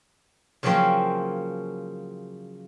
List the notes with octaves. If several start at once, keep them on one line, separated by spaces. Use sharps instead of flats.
C#3 F3 F#3 A#3 C4 C#4